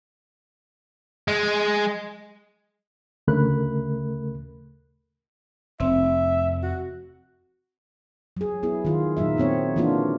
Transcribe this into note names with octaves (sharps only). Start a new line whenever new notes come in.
G#3
D2 C#3 A3 A#4 B5 F#6
F1 C4 E5
F#4
F#3 G#4
B3 E4 G#4
D#3 F4
A#2 F#3 D#4 E5
F#3 B3 C4 C#5
E3 A#3 D4 F4 F#4